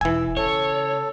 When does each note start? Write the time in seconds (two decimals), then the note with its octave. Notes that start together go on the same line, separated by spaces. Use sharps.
0.01 E1 E3 G#5 E6
0.37 C#3 A4 C#5